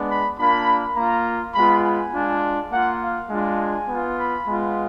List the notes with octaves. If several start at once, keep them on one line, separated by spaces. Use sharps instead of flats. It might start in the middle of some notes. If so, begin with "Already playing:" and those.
Already playing: G#3 B3 D4
B5
A#3 D4 F4 B5
A#3 F4 A#5
G#3 B3 F4 B5
G#5
G#3 D4 F4
A#3 F4 F#5
F5
G#3 D4 F4
G#5
B3 F4
B5
G#3 B3 F4